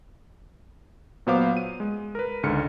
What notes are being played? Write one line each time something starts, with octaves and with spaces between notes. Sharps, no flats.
A#2 F#3 B3 C5 F5 D6
D#7
G#3
A#4 B4
C#2 G#2 D3 F6 C#7